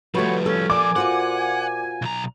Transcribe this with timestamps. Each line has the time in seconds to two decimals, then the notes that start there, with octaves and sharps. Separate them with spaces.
0.15 F3 G3 A3 F#4 B4 C#5
0.46 C#3 C#4 A4
0.70 A#2 F3 D5 G#5 D6
0.96 F4 F#4 C5 F#5
2.02 B1 A#5